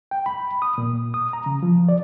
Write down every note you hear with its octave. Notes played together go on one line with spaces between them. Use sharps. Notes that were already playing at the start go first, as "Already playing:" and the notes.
G5
B5
D#6
A#2
D#6
A#5
C#3
F3
D5